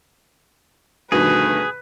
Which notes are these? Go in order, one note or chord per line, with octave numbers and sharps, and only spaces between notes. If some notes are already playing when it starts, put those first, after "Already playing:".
D2 G2 B2 D#3 G#4 B4